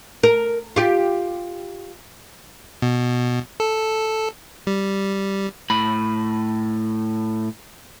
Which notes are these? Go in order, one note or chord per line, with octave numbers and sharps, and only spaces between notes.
A#4
F4 G4
B2
A4
G3
A2 B5